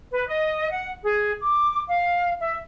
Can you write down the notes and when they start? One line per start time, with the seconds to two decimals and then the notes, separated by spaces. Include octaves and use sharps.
0.11 B4
0.28 D#5
0.71 F#5
1.04 G#4
1.42 D6
1.89 F5
2.41 E5